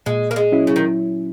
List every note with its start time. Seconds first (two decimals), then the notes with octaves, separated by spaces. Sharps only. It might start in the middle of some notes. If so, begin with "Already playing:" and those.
0.06 A#2 G#3
0.31 A#3
0.36 G#3
0.52 F#3 C#4 E4
0.67 C#3
0.76 D#3